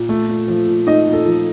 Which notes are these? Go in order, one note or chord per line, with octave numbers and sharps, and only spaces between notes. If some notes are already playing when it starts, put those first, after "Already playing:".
Already playing: A#2
A3
A#2
F3
A#2
A3 D#4 D#5
A#2
A4
F3